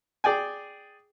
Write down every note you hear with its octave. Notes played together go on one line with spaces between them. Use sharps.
G#4 D5 G5 G#5